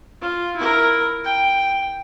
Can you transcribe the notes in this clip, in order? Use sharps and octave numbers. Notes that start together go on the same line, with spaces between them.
F4
E4 A#4
G5